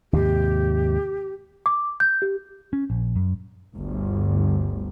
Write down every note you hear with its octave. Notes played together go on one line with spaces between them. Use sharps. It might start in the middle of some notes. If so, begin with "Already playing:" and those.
D#2 G#2 C3 G4
D6
G6
G4
C#4
A#1
F#2
G1 D2